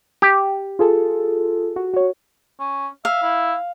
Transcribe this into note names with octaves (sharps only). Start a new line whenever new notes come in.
G4
F4 G#4 A4
F#4
F#4 C#5
C#4
E5 F5
E4